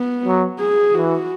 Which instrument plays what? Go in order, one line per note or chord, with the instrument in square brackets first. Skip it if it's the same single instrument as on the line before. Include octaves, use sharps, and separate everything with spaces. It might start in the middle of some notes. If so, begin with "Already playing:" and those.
Already playing: [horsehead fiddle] B3
[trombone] F#3
[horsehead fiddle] G#4
[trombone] E3 [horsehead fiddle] F#4